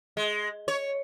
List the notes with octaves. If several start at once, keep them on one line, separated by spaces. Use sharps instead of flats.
G#3
C#5